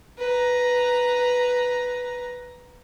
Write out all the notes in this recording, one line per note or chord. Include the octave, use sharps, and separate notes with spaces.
B4 A#5